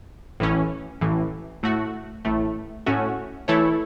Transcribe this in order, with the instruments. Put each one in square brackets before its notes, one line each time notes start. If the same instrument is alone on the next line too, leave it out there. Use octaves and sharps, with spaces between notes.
[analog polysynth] A1 A2 E3 C#4
A1 A2 E3
A2 A3 F#4
A1 A2 A3
A2 A3 C#4 F#4
E3 A3 E4 A4 C#5